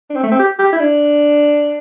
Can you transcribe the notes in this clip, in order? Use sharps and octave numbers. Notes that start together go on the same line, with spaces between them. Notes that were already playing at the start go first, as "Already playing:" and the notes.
D4
C4
A3
C4
G4
G4
E4
D4